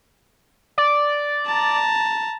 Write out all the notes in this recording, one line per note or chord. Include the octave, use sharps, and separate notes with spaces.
D5
A5 A#5